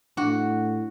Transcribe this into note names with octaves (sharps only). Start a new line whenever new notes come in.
A2 D4 F#4